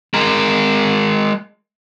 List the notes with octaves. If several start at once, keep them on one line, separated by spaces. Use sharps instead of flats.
G#3 A#4